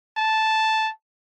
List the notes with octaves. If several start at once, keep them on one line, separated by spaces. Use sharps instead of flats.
A5